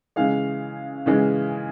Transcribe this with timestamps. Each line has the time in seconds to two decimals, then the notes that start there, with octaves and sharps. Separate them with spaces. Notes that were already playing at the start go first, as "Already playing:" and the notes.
0.16 C#3 E3 G#3 F5
1.06 C#3 E3 G#3